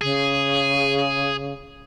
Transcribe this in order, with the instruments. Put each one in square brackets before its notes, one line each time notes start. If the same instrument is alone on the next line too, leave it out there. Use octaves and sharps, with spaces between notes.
[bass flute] C#3 [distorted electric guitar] G#4